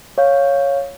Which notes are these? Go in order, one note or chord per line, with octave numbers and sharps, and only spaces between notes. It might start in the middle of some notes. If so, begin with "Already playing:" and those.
C#5 F5 G6